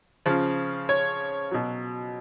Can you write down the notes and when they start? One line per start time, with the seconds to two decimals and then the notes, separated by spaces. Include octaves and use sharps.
0.26 C#3 F3
0.89 C#5
1.51 B2 F#3